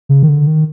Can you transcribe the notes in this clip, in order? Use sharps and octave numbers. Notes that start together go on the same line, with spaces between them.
C#3
D#3
D3
D#3